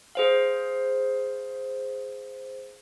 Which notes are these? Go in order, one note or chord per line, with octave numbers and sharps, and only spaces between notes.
G#4 C5 F5